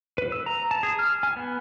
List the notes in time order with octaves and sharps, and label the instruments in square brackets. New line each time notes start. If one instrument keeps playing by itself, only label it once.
[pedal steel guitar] B4
E6
A#5
A5
G#4
F6
G#5
B3